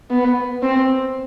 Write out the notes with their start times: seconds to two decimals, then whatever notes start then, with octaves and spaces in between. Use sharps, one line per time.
0.11 B3
0.62 C4